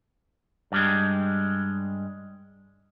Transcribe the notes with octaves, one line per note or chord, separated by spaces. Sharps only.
G2 G3 G#3